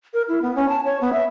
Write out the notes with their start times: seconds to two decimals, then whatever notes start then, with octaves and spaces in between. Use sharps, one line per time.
0.14 A#4
0.28 E4
0.42 B3
0.56 C#4
0.69 A5
0.85 C#5
1.01 B3
1.13 E5